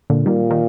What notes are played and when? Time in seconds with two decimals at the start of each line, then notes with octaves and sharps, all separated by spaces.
0.10 A#2 D3
0.26 A#2 D#3 G3
0.51 D#3